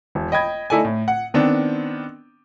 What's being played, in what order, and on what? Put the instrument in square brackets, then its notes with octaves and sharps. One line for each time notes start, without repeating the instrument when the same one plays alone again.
[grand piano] E1
D#5 G5 B5 G#6
A3 D#4 E4 A4 D5 G#5
A2
F#5
D#3 B3 C4 D4